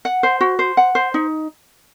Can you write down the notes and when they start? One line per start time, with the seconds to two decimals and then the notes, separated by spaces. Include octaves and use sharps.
0.05 F#5
0.23 C5
0.41 F#4
0.59 C5
0.77 F#5
0.95 C5
1.14 D#4